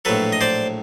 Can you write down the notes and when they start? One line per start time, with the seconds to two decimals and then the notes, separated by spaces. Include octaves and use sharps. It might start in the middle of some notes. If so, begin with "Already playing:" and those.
0.05 A#1 A2 F#3 A4 B4
0.33 D#5
0.41 C5 D5